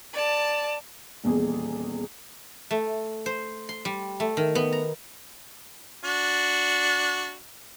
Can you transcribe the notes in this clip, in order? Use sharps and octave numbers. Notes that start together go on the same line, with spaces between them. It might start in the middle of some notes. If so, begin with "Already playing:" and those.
D5 A5
D#1 E2 G#4
A3
C5
C6
G3
A3
D#3
B3
A#5
D4 F#4